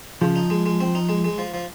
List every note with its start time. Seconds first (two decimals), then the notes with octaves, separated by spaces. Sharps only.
0.21 C#3 F3
0.36 D#4
0.50 G#3
0.66 G#3
0.81 C4
0.95 D#4
1.09 G#3
1.24 G#3
1.38 F3
1.54 F3